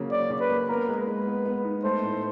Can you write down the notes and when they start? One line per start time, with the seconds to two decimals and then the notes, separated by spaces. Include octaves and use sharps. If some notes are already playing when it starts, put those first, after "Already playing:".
Already playing: C#3 F#3 A#3
0.11 C#4 D5
0.30 C#3
0.40 B4
0.50 A#3
0.68 B3 A#4
0.89 G#3
0.98 B4
1.07 G#3
1.27 B3
1.46 B3
1.64 D#4
1.84 A3 C5
2.03 A2